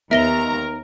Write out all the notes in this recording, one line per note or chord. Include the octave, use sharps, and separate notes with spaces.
D#2 B3 D#4 A#4 E5 A#5 A#6 G7